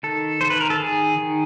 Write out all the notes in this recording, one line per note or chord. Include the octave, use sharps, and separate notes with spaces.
D#3 A4
D#3 C5
B4
A#4
A4
D#3 G#4
D#3